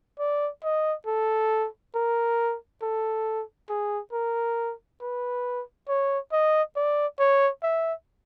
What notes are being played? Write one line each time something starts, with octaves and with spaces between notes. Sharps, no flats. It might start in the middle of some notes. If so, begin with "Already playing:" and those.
D5
D#5
A4
A#4
A4
G#4
A#4
B4
C#5
D#5
D5
C#5
E5